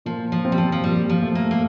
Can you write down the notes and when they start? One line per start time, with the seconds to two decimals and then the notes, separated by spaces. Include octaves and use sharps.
0.06 A#2 F3
0.32 F3
0.45 C4
0.52 G3
0.58 F3
0.72 F3
0.84 A#2 G3
1.09 F3
1.23 A3
1.35 A#3
1.51 A#3